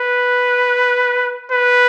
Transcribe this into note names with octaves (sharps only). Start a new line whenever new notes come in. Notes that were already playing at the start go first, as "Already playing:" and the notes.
Already playing: B4
B4